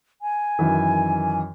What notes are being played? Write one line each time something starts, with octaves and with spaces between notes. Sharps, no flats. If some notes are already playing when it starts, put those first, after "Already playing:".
G#5
F#2 D#3 E3